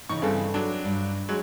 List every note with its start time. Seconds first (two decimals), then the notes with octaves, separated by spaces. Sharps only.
0.09 C#3 E3 D#4 C#6
0.22 G2 C#3 E3 C4 A4 G5
0.54 F#3 D4
0.85 G2
1.29 F#3 G#3